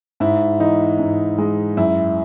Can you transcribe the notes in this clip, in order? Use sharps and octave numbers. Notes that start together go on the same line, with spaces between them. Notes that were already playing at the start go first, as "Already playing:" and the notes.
G#2 E4
E3 D#4
G#2
G#3
F#2 E4